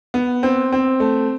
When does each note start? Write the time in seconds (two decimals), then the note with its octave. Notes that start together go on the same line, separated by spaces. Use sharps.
0.14 B3
0.43 C4
0.73 C4
1.00 A3